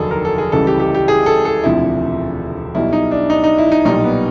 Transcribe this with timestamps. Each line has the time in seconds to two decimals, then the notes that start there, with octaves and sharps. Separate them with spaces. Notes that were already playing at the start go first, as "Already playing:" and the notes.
Already playing: F1 D#2 D3 F#3 G#4 A4
0.11 A#4
0.25 A4
0.38 G#4
0.52 C#2 C#3 E3 G3 A4
0.67 G4
0.80 G4
0.94 G4
1.08 G#4
1.26 A4
1.45 A4
1.64 E1 D2 C3 F3 E4
2.75 B1 B2 G3 E4
2.93 D#4
3.11 D4
3.30 D#4
3.44 D#4
3.58 E4
3.72 D#4
3.85 B1 A#2 G3 D#4
4.04 B3